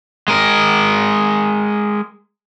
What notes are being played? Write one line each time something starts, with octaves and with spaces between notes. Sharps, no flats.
G#3 A#4